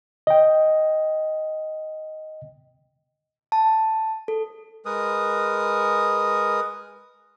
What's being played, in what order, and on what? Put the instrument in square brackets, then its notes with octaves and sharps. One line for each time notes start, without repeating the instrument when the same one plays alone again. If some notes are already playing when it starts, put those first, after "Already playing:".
[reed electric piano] D#5 G5
[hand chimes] A5
A4
[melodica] G#3 A#4 B4 D#6